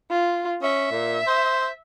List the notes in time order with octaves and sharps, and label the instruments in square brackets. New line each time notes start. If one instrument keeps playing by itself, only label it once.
[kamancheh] F4
[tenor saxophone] C#4 [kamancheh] E5
[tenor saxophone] A#2
C5